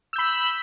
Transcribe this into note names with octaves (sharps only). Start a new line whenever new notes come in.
B5 E6 G6